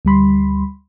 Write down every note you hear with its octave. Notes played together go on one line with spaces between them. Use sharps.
D2 G3 B5 C6